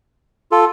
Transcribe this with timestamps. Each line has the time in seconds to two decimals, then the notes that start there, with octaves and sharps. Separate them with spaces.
0.52 F4 A4